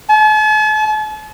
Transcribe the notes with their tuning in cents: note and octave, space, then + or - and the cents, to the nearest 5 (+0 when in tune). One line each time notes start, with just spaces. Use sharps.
A5 -45